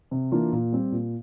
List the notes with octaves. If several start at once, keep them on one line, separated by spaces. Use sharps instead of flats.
C3
E3 A#3 D4 F4
A#2
G3 C4 G4
A#2